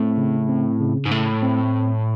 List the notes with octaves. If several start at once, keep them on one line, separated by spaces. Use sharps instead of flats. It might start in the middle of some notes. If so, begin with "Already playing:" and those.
Already playing: A2 C4
C#3
C4
C#3
G#2
A2 A3
C4